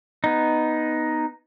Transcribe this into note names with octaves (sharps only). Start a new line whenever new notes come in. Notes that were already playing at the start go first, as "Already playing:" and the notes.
B3 D#4